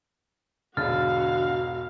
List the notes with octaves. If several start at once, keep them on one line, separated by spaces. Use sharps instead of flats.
E1 G#2 D3 F#4 F5 F6 A6